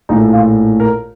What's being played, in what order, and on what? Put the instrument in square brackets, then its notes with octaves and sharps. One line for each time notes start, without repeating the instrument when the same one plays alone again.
[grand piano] A#1 A2 A3 D#4
F4
A#4